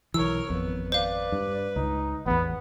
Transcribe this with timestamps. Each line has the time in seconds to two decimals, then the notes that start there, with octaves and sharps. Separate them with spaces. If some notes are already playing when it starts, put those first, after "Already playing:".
0.14 B1 E3 A#4 C#5 E6
0.50 G#1 F2 B3
0.92 B4 C5 D5 F5
1.32 G2
1.76 C#2 D#4
2.26 A1 E2 B3